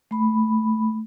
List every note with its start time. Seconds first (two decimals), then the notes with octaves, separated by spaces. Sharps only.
0.11 A3 B5